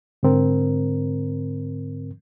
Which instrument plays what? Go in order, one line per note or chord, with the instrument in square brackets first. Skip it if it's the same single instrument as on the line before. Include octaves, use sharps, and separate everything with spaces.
[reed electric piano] G#2 D3 C4 A#4